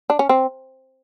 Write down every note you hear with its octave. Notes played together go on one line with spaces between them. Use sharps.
D4
C#4
C4